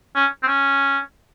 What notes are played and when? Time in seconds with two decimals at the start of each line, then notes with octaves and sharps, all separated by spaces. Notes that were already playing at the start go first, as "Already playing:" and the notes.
0.16 C#4
0.43 C4
0.48 C#4